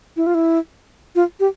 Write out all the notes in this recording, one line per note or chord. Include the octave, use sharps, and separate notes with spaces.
E4
F4
E4
F4
G4